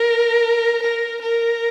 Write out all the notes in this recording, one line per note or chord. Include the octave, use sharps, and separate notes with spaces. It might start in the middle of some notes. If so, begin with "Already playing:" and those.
Already playing: A#4
A#4
A#4